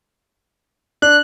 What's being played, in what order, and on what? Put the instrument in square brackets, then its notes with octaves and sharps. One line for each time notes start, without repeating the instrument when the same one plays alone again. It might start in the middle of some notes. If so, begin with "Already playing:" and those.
[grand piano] D4 [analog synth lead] F#6